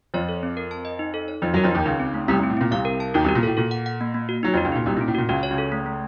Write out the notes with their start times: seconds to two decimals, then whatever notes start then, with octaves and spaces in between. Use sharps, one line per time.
0.14 F2 F3 C#5
0.29 A4
0.43 C4
0.57 A#4
0.71 A5
0.85 D#5
0.99 D#4
1.14 A4
1.28 C#5
1.42 F2 F3 D#4
1.54 F#2 F#3 A#4
1.64 F2 F3
1.71 D#2 D#3 D#4
1.85 C#2 C#3 D#4
2.00 C4
2.14 A3
2.28 C2 C3 A3
2.39 C2 C3 C4
2.50 A2
2.57 A#2 C4
2.71 C2 C3 F5
2.85 A#4
3.00 A5
3.14 D#2 D#3 F#4
3.24 C2 C3 F#4
3.35 A#2
3.43 A2 A4
3.57 A#2 A4
3.71 F#5
3.86 F#5
4.01 A#3
4.14 A#3
4.29 F#4
4.43 F#3 D#4
4.54 F2 F3 F#4
4.65 C#2 C#3
4.72 A#2 D#4
4.86 C2 C3 A#3
4.97 A#2 C#4
5.08 A2
5.15 A#2 F#4
5.29 C#2 C#3 F#4
5.43 C#5
5.50 C#2 C#3
5.58 A4
5.72 A3
5.86 A3